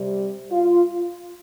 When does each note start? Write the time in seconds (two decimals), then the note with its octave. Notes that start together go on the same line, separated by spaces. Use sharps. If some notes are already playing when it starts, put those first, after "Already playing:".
Already playing: C3 G3
0.51 F4